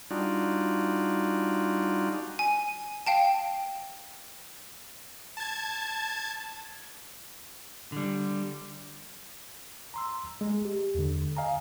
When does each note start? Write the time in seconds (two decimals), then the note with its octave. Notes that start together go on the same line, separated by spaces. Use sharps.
0.11 G3 D4 D#4 F4 F#4
2.39 G#5
3.07 F5 G5 A5
5.37 A5 G#6
7.92 D3 G3
9.94 A#5 C6 E6
10.41 G#3
10.65 G4
10.95 E2 D3
11.37 D#5 F5 G#5 A#5